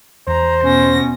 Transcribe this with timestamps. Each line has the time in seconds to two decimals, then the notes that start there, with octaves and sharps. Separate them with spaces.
0.28 E2 C5 A#5
0.64 B2 C#4 A#6